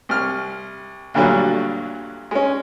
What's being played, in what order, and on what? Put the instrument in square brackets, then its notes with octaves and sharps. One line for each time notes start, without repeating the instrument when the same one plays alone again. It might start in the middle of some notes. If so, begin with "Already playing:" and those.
[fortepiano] C2 F6
D2 G2 A#2 D3 F#3 G3
G#3 C#4